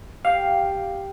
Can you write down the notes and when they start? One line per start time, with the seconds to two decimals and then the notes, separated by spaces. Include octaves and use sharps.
0.25 G4 F5